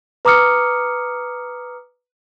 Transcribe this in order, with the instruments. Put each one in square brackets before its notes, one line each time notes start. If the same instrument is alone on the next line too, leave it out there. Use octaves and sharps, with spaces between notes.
[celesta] B4 A#5 D6 D#6 F6 C#7